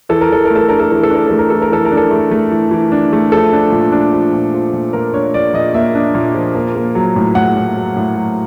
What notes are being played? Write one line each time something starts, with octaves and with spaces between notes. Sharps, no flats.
E3 A4
A#4
E3 A4
A3 A#4
A4
D4 A#4
A4
E3 A#4
A4
D4 A#4
A3 A4
A#4
E3 A4
A#4
E3 A4
A#4
D4
A4
A3
A3
E3
E3
D4
A3
F3 A4
D4
A#2
D4
F3
A#2
F3
A#2
A#2 A#4
D4 C#5
A#2 D5
A#2 D#5
A#3 E5
D4
A#2
F3
A#3
A#3
F#3
A2
A2 F#5
A2
F#3
A2
F#3